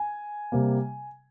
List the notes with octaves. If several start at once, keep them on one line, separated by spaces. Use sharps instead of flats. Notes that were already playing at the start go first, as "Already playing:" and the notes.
Already playing: G#5
C3 G3 A#3